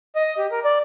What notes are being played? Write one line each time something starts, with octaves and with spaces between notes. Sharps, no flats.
D#5
G4
A#4
D5